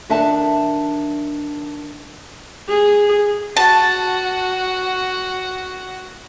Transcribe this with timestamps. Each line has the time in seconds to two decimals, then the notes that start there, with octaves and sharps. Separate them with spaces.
0.09 D#3 D4 E5 F#5 A5
2.69 G#4
3.57 F#4 A5